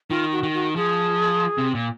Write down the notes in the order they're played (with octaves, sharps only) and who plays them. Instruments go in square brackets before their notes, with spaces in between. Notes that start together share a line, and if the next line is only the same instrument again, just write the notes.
[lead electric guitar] D#3 [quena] F4
[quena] F#4
[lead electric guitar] D#3
[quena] F#4
[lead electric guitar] F3 [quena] G#4
[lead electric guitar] C3
A#2